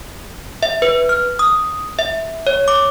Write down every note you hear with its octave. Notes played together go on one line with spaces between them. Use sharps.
E5
B4
F6
D#6
E5
C#5
D6